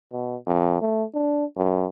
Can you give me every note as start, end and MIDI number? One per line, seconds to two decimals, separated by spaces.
0.12 0.36 47
0.47 0.80 41
0.81 1.04 57
1.15 1.45 62
1.57 1.86 42